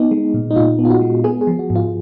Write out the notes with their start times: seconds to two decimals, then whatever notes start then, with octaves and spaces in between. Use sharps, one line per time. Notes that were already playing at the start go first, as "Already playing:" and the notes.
Already playing: B3 D#4
0.11 G#3
0.34 A#2
0.51 D#4
0.56 A#2 F4
0.79 B3
0.85 F4
0.90 F#4
1.01 G#3
1.24 B3 G#4
1.41 G#4
1.47 F3
1.59 F#4
1.70 G#2
1.76 F4